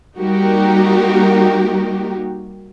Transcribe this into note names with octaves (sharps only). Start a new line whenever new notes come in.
G3 A#3 D#4 F#4 G4 A#4